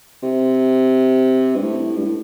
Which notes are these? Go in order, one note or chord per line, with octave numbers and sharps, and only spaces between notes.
C3
G2
A2
G2
A2